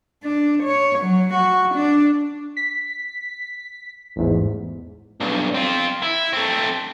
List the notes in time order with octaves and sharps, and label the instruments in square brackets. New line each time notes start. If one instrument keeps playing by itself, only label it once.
[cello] D4
C#5
F#3
F#4
D4
[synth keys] B6
A1 E2 G#2
[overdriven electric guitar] B1 G2
C4 F4
E4
A3 C4